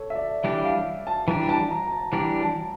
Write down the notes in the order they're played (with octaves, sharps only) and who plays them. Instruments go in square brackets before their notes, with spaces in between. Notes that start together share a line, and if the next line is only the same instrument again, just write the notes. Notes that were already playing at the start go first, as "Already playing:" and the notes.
Already playing: [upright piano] A4 C#5
E5
D5
[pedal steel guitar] E3 G3 D4 G4 [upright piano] E5
[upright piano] F5
A5
[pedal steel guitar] E3 G3 D4 G4 [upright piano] A#5
[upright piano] A5
A#5
A#5
A5
[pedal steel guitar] E3 G3 D4 G4 [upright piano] A#5
[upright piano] A5